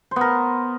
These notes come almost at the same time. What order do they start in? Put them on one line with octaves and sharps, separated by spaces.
C5 B3 A#4